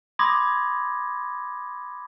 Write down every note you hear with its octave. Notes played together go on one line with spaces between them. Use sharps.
B5 C6 D6 D#6 G#6 A#6